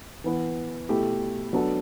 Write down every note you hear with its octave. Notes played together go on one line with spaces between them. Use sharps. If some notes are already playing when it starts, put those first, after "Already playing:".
E3 B3 E4 B4
B2 A3 E4 G4
F#3 B3 D4 A4